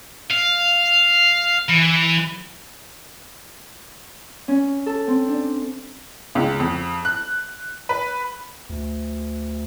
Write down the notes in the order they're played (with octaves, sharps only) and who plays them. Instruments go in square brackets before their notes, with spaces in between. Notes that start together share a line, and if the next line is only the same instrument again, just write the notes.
[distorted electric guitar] F5
E3
[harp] C#4
A4
C4
D4
[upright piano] C#2
F2
F#6
B4
[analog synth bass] D2